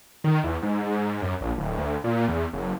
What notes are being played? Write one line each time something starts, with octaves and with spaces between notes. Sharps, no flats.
D#3
E2
G#2
G#2
F#2
A#1
D1
D2
A#2
E2
F#1